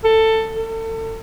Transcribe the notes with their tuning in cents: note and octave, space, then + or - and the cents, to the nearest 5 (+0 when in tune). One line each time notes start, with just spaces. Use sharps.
A4 +15
A4 +35